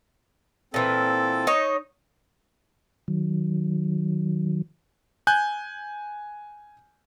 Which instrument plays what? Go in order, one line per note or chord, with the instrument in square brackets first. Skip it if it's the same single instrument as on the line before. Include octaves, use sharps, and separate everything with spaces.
[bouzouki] A#2 E3 [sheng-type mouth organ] C4 A4
[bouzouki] D#4 C#5
[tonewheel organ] D#3 F#3
[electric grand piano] G#5 F#6 G6